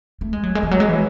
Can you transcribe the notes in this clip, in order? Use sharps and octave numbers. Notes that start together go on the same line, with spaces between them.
A3
G#3
F#3
G#3
E3
F#3
G#3
E3